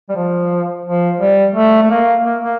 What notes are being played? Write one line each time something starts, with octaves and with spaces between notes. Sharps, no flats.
G3
F3
F3
G3
A3
A3
A#3
A#3
A#3